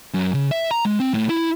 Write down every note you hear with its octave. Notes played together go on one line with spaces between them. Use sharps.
F#2
C#3
E5
A#5
G#3
C4
A2
E4